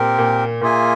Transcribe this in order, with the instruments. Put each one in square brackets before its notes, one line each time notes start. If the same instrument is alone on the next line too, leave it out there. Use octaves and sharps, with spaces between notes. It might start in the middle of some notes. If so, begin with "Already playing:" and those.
Already playing: [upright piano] A#2 [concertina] C4 G4 A#4
[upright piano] A#2
[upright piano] A#2 [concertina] A#3 F4 G#4 E5 G#5